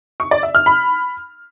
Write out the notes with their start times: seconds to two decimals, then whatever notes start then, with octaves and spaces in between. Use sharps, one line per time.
0.20 C#6
0.31 D5
0.43 E5
0.55 F6
0.66 B5